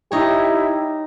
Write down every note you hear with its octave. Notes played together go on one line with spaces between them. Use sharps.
D#4 E4 G4 C#5